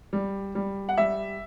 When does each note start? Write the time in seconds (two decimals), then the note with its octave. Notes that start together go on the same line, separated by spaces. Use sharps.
0.13 G3
0.55 G3
0.89 F#5
0.98 G3 E5